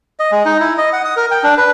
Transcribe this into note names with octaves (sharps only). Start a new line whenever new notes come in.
D#5
G#3
D#4
E4
D#5
F#5
D#6
A#4
G5
D4
B4